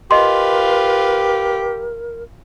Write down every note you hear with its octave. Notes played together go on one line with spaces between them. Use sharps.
F4 G4 A#4 B4 D#5 C6